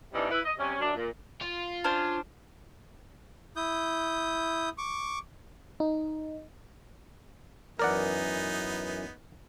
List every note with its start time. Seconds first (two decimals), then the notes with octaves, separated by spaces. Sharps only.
0.14 C3 E3 G3 D4 D#4
0.30 E4 B4
0.45 D#5
0.58 C3 G3 C#4
0.80 F#2 D4
0.95 A#2
1.42 F4
1.84 C#4 D4 C5
3.56 E4 D#6 G6
4.78 C#6 D6
5.80 D#4
7.79 F#2 E3 B3 D#4 A#4 D5 F#5